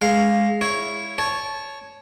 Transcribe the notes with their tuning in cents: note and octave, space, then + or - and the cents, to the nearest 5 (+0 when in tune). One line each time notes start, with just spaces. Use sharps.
G#3 +0 F5 +0
E4 +0 C#5 +0
C#5 +0 A5 -15